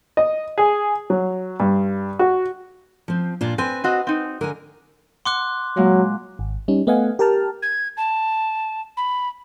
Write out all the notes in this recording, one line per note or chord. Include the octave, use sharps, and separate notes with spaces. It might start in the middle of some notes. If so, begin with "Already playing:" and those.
D#5
G#4
F#3
G2
F#4
F3 C4
A#2 D4 F4
C4 B4 G#5
C4 F#4 D#5
C4 D#4
D3 A#4 G#5
F#5 C6 D6 F#6
A#2 F#3 G#3 A#3
G#1
G3 C#4 D#4
A3 B3 D#5 F5 F#5 G#5
G4 A#4 G5 A5 F6
G#6
A5
B5